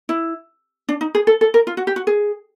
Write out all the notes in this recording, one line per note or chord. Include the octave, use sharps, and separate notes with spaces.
E4
D4
D#4
G#4
A4
A4
A#4
F4
F#4
G4
F#4
G#4